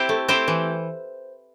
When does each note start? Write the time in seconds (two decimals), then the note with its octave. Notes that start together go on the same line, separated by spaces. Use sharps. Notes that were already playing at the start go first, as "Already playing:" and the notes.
Already playing: C4 E4 G4 C5
0.09 A3
0.28 C4 E4 G4 C5
0.48 E3